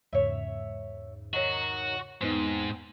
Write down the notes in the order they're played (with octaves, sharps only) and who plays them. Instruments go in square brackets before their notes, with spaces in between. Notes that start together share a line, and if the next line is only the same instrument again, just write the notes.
[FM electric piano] E2 G#2 C#3 [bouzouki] C#5 E5
[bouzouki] D#3 F#3 [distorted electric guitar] F#4
[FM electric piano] E2 B3 D#4 [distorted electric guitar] G#2 [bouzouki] C4